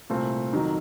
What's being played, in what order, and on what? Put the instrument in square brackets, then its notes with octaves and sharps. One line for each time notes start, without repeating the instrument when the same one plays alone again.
[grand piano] C2 A#2 A3 C4
F2 D#3 F#3